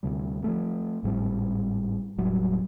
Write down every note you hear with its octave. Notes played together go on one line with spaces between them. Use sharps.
D2 C3 G3
F3 F#3 A3
G#1 A2 G3 C4
E1 A2 F#3 G3